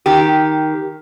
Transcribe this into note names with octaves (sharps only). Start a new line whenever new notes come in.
D#3 G4